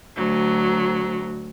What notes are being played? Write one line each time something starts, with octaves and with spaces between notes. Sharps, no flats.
D2 F#3